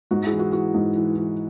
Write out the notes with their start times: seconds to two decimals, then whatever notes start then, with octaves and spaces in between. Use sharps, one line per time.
0.11 G#2 F#4
0.25 E4 G#4
0.32 E3
0.39 F#4
0.53 E3 F#4
0.74 G#2
0.96 E3
1.16 E3